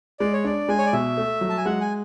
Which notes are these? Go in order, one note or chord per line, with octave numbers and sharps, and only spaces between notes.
G#3 D5
C#5
D4 D5
G#3 G#5
C#5
D5
B2 E5
A3
F#3
A5
G#5
G#3 F#5
G#5